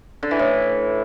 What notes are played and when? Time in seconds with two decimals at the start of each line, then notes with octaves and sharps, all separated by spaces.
0.23 D3
0.31 E3
0.39 A2